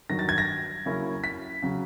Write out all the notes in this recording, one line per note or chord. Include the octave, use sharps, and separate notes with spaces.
G2 D#3 F#3 A#6
A6
G#6
A#6
C#3 F#3 A#3 C#4 E4
B6
C#3 F#3